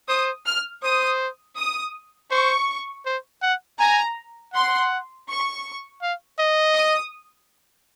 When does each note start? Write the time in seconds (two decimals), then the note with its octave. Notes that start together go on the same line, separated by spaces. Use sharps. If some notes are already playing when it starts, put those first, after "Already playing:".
0.09 C5 D#6
0.46 F6
0.83 C5 D#6
1.57 D#6
2.31 C5 C#6
3.06 C5
3.42 F#5
3.79 G#5 A#5
4.54 F#5 C6
5.28 C#6
6.02 F5
6.39 D#5
6.76 D#6